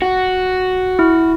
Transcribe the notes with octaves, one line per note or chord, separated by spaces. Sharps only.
F#4
E4